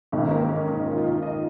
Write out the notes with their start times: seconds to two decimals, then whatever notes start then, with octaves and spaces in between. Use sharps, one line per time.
0.12 G#1 G#2 D#3 C#4
0.31 A#3
0.49 C#4
0.67 D#4
0.86 F4
0.98 F4
1.04 D#4
1.23 D#5